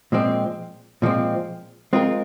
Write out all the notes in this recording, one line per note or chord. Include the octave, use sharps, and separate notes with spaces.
A#2 F3 G#3 C4
A#2 F3 G#3 C4
G#3 C4 F4 A#4